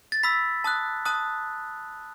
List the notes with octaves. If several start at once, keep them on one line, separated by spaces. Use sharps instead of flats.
A6
B5 E6 B6
A5 D#6 F#6
A5 D#6 F#6